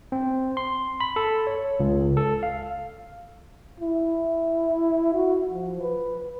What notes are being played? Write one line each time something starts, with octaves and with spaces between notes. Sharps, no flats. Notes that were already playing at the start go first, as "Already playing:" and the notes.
C4
C6
B5
A4
C#5
C#2
A4
F5
E4
F#4
F3
B4